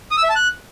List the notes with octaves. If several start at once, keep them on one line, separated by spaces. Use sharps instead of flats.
D#6
E6
E5
A5
F#6